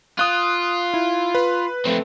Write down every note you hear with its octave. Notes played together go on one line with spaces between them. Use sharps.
F4 D#6 F#6
E4
B4
A3 C4